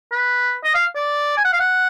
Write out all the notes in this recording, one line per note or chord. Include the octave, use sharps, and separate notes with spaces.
B4
D#5
F5
D5
G#5
F#5
F5
F#5